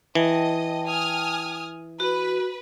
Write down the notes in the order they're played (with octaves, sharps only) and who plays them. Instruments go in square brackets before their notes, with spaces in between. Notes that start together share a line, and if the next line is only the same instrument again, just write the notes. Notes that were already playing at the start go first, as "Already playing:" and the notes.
[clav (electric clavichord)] E3 [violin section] D#5 [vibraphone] G5 A5
[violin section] G#5 D#6 F6
[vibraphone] F#4 [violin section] B4